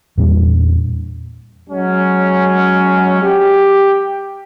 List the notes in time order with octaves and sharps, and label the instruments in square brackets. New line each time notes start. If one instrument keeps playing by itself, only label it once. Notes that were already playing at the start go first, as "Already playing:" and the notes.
[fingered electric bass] E2 A#2 G3 D4
[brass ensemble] F#3 G#3 C#4
G4